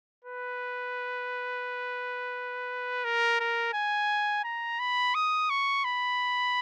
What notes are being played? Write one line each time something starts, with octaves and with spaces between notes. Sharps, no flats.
B4
A#4
A#4
G#5
A#5
B5
D#6
C#6
B5